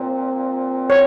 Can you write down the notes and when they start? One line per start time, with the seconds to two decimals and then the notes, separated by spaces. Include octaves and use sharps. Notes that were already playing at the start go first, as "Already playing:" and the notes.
Already playing: A#2 F3 C4
0.90 C#5